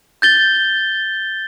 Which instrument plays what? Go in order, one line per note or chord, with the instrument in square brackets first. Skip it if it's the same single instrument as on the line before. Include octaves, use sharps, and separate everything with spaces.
[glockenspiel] G6 A6 G7